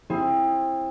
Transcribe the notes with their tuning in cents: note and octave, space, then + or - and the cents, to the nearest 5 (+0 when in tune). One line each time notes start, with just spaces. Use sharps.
C4 +25 E4 +0 G#4 +10